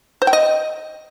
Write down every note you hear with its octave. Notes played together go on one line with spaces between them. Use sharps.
C5
G5
D#5